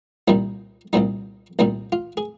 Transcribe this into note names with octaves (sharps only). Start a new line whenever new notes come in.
C2 A#2 G3 D#4
C2 A#2 G3 D#4
C2 A#2 G3 D#4
F4
G#4